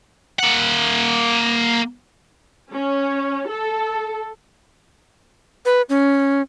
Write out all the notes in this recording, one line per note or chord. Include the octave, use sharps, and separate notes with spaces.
A#3 F#5
C#4
A4
B4
C#4